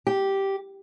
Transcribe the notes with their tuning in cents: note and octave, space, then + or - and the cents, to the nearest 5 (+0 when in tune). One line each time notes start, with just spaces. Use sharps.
G4 -5